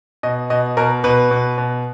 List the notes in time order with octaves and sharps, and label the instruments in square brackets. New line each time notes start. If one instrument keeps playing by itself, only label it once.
[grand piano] B2 D#5
B2 D#5
B2 A#4
B2 B4
B2
B2